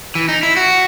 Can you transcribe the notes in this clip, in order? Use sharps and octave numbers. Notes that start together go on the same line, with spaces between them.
E3
D#4
E4
F#4